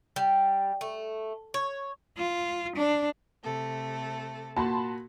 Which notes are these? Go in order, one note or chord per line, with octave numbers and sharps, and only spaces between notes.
G3
A3
C#5
F4
D4
C3 A3 A4
A#2 F#4 A5 B5 C6